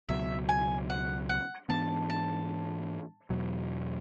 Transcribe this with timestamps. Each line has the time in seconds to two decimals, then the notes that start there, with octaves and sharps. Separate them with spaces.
0.09 C#2 B2 F#3 E5
0.49 G#5
0.90 F#5
1.29 F#5
1.69 G#2 E3 B3 D4 A5
2.10 A5
3.30 E2 B2 F#3